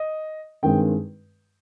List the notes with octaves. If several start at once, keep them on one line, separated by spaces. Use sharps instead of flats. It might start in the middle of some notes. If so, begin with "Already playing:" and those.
Already playing: D#5
G2 D#3 G#3 C4 G5